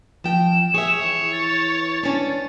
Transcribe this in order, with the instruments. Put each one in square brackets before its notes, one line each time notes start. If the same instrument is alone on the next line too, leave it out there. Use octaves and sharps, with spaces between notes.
[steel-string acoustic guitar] F3 G5 [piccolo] E7
[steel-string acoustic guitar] G#4 E5 [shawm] C#5
[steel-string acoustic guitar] E3
[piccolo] A6
[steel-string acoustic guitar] C#4 D4